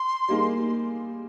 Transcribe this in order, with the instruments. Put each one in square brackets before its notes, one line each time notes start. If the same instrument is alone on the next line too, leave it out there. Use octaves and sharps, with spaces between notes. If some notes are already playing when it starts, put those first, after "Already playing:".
Already playing: [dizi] C6
[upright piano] G3 A#3 D#4 G#4